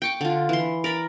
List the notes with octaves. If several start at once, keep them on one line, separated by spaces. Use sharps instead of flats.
G5 C#6 D6
D3 F4
E3 C6
A#4 D5 B5